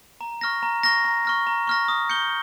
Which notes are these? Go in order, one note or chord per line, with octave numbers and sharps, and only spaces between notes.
A#5
C#6 F6 A#6
A#5
C#6 F6 A#6
A#5
C#6 F6 A#6
A#5
C#6 F6 A#6
D#6
G6 C#7 G7